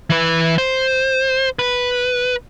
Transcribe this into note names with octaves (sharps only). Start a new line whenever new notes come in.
E3 B4
C5
B4